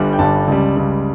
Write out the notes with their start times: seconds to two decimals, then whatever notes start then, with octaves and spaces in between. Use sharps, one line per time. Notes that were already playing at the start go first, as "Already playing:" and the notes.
Already playing: G1 G2 D3 G3
0.13 G5
0.19 G1 G2 D3 G3 A5
0.48 C#2 C#3 G3
0.77 C#2 C#3 G3